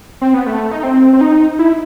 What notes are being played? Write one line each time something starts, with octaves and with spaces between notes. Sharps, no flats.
C4
B3
A3
D#4
C4
C4
D#4
E4